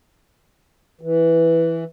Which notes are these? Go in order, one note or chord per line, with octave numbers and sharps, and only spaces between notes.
E3